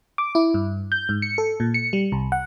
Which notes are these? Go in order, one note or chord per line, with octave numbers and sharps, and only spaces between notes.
D6
E4
G2
G6
G#2
C#7
A4
A#2
C#7
G3
C2
F#5